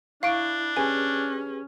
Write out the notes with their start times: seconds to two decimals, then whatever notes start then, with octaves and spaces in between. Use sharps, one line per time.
0.23 D4 E4 F5 C#6 D7
0.77 C#4 G4 G#4 B4 G#5